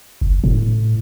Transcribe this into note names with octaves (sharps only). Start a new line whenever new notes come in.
F#1
A2